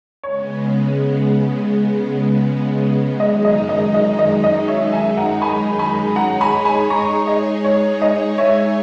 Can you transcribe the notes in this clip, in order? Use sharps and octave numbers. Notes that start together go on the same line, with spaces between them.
C#3 G#3 B3 C#5
F#2 D#3 G#3 D#4 D#5
D#5
D#5
D#5
D#5
D#5
C#5 E5
E5 G#5
F#5 A#5
G#5 B5
G#5 B5
G#3 D#4 G#4 C#5 F#5 A#5
G#5 B5
G#5 B5
A#5 C#6
D#5
C#5
D#5
C#5 E5